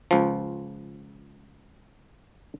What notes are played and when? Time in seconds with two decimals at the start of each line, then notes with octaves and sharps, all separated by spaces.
0.11 C#2 F3